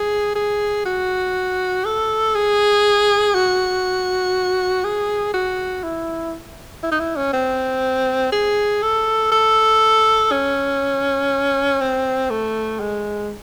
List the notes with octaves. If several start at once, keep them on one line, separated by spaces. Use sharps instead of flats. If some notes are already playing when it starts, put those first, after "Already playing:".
Already playing: G#4
G#4
F#4
A4
G#4
F#4
G#4
F#4
E4
E4
D#4
E4
C#4
C4
G#4
A4
A4
C#4
C4
A3
G#3